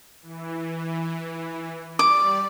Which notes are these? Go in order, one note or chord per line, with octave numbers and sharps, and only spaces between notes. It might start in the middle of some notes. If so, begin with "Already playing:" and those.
E3
G3 D5 D6